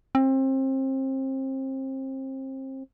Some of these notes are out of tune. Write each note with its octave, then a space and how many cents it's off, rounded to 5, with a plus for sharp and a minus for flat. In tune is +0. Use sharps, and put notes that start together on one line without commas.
C4 +30